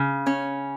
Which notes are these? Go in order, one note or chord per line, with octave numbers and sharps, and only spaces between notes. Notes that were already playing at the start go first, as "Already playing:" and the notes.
Already playing: C#3
C#4